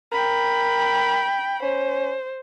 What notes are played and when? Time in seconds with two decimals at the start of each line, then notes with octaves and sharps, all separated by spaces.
0.12 A#4 G5 B5
1.63 C#4 C5